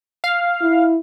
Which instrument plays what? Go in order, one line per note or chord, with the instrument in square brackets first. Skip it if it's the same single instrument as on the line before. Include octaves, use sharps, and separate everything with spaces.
[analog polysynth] F5
[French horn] E4